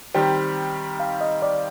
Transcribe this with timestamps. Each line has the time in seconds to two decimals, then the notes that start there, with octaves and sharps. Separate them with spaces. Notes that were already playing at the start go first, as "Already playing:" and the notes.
0.14 D#3 G3 C4 G4 G5
1.00 F5
1.21 D#5
1.42 D5